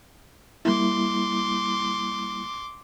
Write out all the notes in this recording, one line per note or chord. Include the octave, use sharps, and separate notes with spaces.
G3 A#3 E4 C6 D6